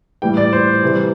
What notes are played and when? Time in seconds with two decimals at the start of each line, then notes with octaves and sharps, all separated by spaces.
0.22 A2 E3 G3 G5
0.37 D5
0.53 C5
0.83 C3 E3 G3